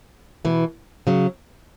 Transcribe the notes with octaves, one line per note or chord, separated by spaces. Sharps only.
B2 E3
C#3 F#3